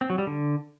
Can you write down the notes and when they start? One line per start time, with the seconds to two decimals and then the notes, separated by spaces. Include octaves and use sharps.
0.01 C4
0.10 F#3
0.18 G3
0.27 D3